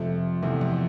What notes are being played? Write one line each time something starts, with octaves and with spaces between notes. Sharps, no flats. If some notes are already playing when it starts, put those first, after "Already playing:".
Already playing: F2 C3 F3 A3
E2 C3 F3 A3
F2